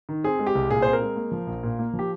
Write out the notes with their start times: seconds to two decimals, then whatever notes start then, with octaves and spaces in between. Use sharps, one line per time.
0.09 D#3
0.24 C4 G#4
0.39 G#3
0.47 G4
0.55 C2
0.70 A#2 G#4
0.82 C4 C5
0.93 A#4
1.02 G#3
1.16 A#3
1.32 F3
1.47 A#1
1.63 A#2
1.79 A#3
1.94 F3
1.99 G4